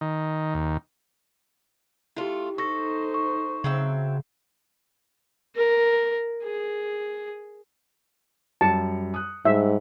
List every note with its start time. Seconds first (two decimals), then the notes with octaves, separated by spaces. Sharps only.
0.01 D#3
0.54 D#2
2.17 A3 E4 F4 G4
2.58 D#4 A4 C5 C#6 A#6
3.14 C#6
3.64 C#3 F#3 C4 E5
5.56 A#4
6.43 G#4
8.61 F#2 G3 A5 C#7
9.14 D#6 F#6
9.45 G#2 G3 E5